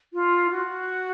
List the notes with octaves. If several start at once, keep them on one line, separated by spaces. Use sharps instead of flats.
F4
F#4